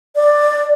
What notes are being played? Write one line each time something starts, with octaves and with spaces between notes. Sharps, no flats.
D5